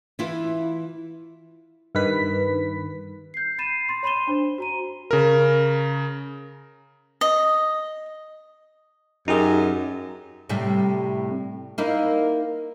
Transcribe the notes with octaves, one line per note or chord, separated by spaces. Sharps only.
E3 E4 F4 B4
G2 D#3 B4 B6
G6 C7
B5 A6 C7 D#7 E7
C6 A6
C#5 B5 C6 D#7 E7 G7
D4 C5
F#4 A#5 D#7
C#3 A#4
D#5
F#2 D#4 G4 G#4
A2 C3 G3
A#3 D#4 E4